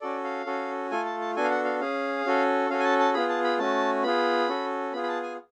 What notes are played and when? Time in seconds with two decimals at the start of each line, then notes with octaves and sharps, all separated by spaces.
0.01 C#4 F#4 A4 D5
0.24 F5
0.46 C#4 F#4 A4
0.91 A3 F4 A4 G#5
1.05 A5
1.21 A5
1.36 B3 D4 F#4 A4 G#5
1.44 F5
1.51 F#5
1.65 F5
1.80 C#4 G#4 F5
2.25 C#4 F#4 A4
2.70 C#4 F#4 A4 F5
2.79 G#5
2.84 A5
3.00 A5
3.14 B3 F4 G#4 B5
3.29 A5
3.44 B5
3.59 A3 C#4 F#4 A5
4.03 B3 F4 G#4 B5
4.49 C#4 F#4 A4
4.93 B3 F4 G#4 B5
5.03 B5
5.08 A5
5.23 G#5